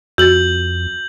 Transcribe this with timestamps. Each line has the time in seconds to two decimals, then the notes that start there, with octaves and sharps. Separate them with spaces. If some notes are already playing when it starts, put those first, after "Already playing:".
0.18 F2 F#4 G6 A6 F#7